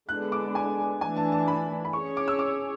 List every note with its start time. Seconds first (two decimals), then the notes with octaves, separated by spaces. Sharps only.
0.09 D3 G#3 B3 D4 F#6
0.32 D6
0.55 G#5
1.01 E3 A3 D4 G#5
1.16 A5
1.32 A5
1.48 B5
1.85 B5
1.93 C#4 G#4 C#5 C#6
2.17 D6
2.28 E6
2.39 D6